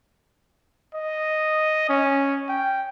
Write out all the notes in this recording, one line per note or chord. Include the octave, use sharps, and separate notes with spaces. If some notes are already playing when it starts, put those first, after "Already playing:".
D#5
C#4
G5